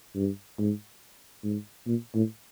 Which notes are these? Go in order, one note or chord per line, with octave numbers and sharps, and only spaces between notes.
G2
G#2
G#2
A#2
A2